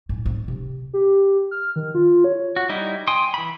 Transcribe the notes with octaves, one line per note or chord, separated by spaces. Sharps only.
A2
C4
C3
G4
F6
D#3
F4
C#5
F#4
G3 D#4 E4
G5 G#5 C6 D#6
E3 B5